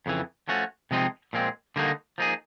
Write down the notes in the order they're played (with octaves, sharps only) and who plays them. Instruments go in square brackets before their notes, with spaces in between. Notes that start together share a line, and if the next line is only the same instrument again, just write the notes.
[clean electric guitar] F2 C#3 E3
F3 A3 C#4 F#4
C3 F3 G#3 C4 D#4
A#2 F3 G#3 C4
D3 G3 A#3 D#4 F#4
F3 A#3 D#4 G#4